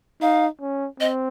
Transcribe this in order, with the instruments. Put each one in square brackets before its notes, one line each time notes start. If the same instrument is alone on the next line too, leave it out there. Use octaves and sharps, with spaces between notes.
[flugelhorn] D#4 [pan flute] F5
[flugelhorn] C#4
[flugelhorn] C4 [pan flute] D#5